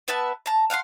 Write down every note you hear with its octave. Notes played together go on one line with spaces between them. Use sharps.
B3 B4 E5 A5
A5 A#5
F5 F#5 A#5 C6